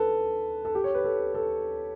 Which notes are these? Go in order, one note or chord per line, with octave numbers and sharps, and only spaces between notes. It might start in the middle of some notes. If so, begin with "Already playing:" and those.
Already playing: A4 B4
A4
G4
C#5
B4
A4
A4